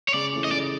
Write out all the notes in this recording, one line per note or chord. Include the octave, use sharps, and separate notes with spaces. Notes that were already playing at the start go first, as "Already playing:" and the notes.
C#5
C#3 D5
E3 A3 C#4
D#5
C#3 D5